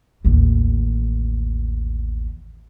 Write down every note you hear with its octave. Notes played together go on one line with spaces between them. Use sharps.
A1 D#2